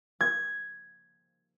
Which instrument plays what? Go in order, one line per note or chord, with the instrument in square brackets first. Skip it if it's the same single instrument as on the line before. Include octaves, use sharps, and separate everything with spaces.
[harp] G#6